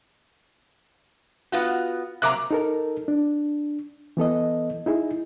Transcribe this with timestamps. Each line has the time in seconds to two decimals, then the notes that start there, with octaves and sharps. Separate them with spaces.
1.52 B3 F4 F#4
2.22 C3 F#3 A#3 A#5 D6 F#6
2.51 D#4 A4 A#4
3.08 D4
4.17 E3 B3 A4 D#5
4.86 D#4 E4 G#4